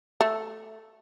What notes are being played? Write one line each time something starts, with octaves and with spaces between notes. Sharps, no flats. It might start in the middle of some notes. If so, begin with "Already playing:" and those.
A3